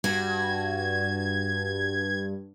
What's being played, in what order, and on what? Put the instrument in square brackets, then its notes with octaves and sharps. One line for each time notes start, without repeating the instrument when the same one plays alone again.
[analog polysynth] G2 [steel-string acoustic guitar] F#4 [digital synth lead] G#6